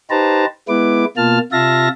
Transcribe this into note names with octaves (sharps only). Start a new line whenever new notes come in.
D#4 G4 B4 C5 A5 A#5
G#3 B3 E4 B4 D6
B2 A#3 F4 A5 F6
C3 F4 E5 F5 A5 A#6